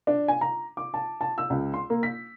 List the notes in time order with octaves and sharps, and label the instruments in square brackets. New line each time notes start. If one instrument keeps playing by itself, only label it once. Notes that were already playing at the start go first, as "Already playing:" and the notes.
[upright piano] D4
G#5
A#5
D6
A5
A5
E6
C#2
C6
A#3
B6